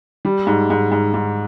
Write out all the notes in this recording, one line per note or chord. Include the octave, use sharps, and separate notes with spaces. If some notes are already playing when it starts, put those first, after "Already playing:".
G3
G#2
G#2
G#2
G#2